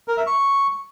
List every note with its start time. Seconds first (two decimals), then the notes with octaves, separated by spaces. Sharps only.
0.08 A#4
0.17 E5
0.27 C#6